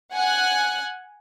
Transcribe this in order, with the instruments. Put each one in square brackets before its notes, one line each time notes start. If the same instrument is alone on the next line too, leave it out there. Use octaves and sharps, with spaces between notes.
[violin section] F#5 G#5 F#6